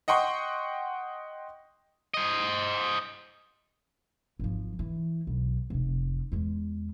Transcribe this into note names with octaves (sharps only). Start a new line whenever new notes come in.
D#5 F#5 G5 C6 C#6
C5 D#5
G#1 F3
E3
B1
F1 C3
E2 G#3